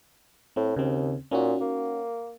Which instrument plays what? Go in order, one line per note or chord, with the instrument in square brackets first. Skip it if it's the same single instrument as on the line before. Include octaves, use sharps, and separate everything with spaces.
[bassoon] A2 [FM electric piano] C4
[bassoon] D#2 [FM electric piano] C#3 C4
[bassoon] A#2 [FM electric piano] C#4 D#4 F#4
[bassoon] A#3